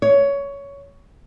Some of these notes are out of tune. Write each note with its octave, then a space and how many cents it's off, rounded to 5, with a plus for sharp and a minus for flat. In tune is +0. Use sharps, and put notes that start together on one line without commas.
C#5 +15